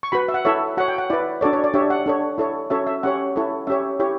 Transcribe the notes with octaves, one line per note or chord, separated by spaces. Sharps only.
C#6
F#4 B4 B5
E5
F#5
E4 A4 C#5 E5
F#4 C#5 F#5
G5
F#5
E4 B4 D5
D4 F#4 A4 C#5 D5
C#5
D5
D4 G4 C#5 E5
F#5
D4 A4 C#5
E4 A4 C#5
C#4 F#4 A4 C#5 E5
E5
C#4 G4 C#5 F#5
E4 A4 C#5
C#4 G4 C#5 E5
E4 G4 C#5